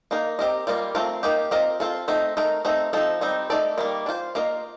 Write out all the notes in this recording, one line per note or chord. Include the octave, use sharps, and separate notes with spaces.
A#3 D#4 A#4
C4 G4 A#4 D#5
G3 A#3 F4 A4 D#5
A3 C4 F4 A#4
A#3 D#4 G4
C4 F4 A#4 D#5
C4 F4 A4
A3 C4 D#4
A3 D#4 A#4
A3 C4 D#4
F3 C4 D#4 A4
G3 C4 D#4
A3 D#4 A4 D5
D#3 G3 A#3
D4 F4 C5
A#3 F4 A#4 D#5